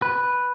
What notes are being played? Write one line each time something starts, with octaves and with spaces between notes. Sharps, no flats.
B4